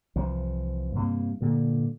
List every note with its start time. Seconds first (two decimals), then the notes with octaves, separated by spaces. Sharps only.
0.16 C2 E3 F3
0.95 G2 C3 A#3
1.41 G2 A#2 D3